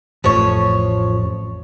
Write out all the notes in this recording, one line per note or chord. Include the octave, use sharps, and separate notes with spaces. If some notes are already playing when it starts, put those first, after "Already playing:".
A1 F2 F3 A3 C#5